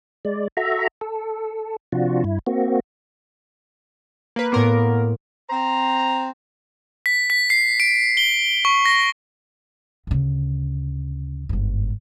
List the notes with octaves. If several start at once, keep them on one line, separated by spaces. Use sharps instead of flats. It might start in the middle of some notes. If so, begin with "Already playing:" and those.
G#3 D5
F#4 A4 E5 A#5
A4
C3 F3 D4 F4 F#4
G2 E4
A#3 C4 F#4
A#3 B4
A2 A#3 B3 A#4 C6 D6
C4 C5 A#5
B6
B6
C7
D7
G7
C#6
A#6
D2 C#3
G1 G#2